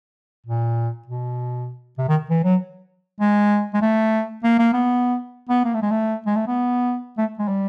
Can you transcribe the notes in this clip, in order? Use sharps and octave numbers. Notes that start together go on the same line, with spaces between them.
A#2
B2
C3
D#3
E3
F#3
G#3
G#3
A3
A#3
A#3
B3
B3
A#3
A3
G#3
A3
G#3
A3
B3
A3
G#3
G3